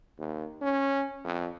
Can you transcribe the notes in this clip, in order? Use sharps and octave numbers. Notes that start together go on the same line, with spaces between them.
D#2
C#4
F2